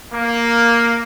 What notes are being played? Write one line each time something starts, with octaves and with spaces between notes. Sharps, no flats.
A#3